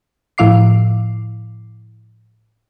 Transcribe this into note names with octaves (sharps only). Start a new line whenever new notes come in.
A2 F3 E4 F5 D6 C7